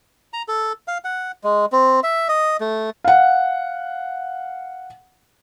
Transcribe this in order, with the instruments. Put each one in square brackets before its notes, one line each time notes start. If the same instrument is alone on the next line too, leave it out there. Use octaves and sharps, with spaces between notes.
[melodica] A#5
A4
F5
F#5
G#3
C4
E5
D#5
A3
[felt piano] F5 F#5